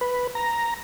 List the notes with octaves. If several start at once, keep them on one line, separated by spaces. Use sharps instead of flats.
B4
A#5